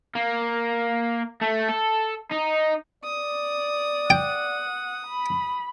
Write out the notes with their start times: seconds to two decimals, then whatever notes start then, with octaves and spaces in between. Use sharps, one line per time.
0.15 A#3
1.41 A3
1.68 A4
2.32 D#4
3.04 D5 D#6
4.10 F#5 G5
5.07 B5